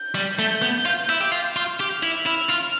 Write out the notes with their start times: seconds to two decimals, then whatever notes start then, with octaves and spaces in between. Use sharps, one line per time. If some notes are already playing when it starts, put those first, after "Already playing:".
Already playing: G6
0.15 G3
0.39 A3
0.62 B3
0.85 F4
1.09 E4
1.21 G4
1.32 F4
1.56 F4
1.79 G4 F6
2.03 E4
2.26 E4
2.50 F4